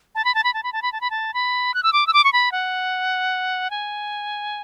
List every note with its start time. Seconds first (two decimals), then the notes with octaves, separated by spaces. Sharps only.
0.15 A5
0.25 B5
0.35 A5
0.44 B5
0.54 A5
0.64 B5
0.73 A5
0.82 B5
0.92 A5
1.01 B5
1.11 A5
1.34 B5
1.74 F#6
1.83 E6
1.93 D6
2.07 E6
2.13 D6
2.24 C#6
2.33 B5
2.52 F#5
3.71 G#5